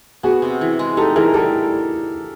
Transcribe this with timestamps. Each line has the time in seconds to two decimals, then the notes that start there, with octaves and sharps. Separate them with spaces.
0.23 B3 F#4 G#4
0.42 C3
0.61 E3
0.79 G#3
0.97 D#4 G4 A4
1.16 E3 G#4 A#4
1.34 G3 G4 A4